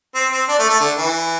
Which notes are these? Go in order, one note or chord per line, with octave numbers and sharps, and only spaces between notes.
C4
C4
D4
A3
A3
D3
E3